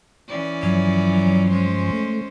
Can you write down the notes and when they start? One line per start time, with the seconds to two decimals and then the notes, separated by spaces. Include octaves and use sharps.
0.28 E3 C#4 D5
0.63 G2 F3 F#3
1.50 G#3 C#4 C5
1.92 A3